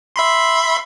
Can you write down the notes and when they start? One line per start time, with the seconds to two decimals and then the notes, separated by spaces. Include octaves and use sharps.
0.16 E5 B5 C6